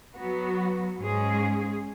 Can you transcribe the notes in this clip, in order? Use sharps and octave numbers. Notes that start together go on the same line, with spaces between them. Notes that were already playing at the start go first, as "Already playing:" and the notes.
F#3 B3 F#4
G#2 G#3 C#4 G#4